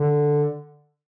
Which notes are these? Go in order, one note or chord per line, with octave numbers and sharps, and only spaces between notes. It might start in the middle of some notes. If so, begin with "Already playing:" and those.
Already playing: D3